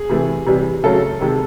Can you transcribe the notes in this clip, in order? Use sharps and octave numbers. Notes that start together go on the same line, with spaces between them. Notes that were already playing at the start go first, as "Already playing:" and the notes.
Already playing: G#4
C3 E3 A3
C3 E3 G3
C#3 F#3 A3 A4
C3 D#3 G#3